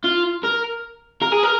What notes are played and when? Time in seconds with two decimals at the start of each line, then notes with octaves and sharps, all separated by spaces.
0.04 F4
0.43 A#4
1.22 A#4
1.32 G#4
1.44 A#4